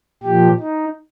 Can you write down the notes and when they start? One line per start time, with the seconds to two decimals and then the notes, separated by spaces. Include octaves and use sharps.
0.23 A#2 F3 G4
0.59 D#4